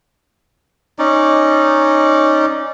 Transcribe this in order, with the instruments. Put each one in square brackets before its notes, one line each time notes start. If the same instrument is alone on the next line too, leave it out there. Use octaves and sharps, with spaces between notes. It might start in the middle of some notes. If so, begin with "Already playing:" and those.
[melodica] C#4 D#4 D5